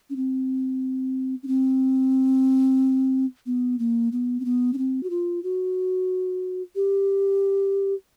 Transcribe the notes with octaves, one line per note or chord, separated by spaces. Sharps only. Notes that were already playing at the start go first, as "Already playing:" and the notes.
C#4
C4
C#4
C4
B3
A#3
B3
C4
B3
C#4
C4
F#4
F4
F#4
G4